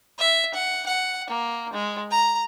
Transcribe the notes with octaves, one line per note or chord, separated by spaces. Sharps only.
E5
F#5
F#5
A#3
G#3
A#5